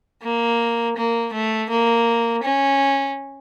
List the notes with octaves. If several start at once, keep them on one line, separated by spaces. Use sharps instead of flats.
A#3
A#3
A3
A#3
C#4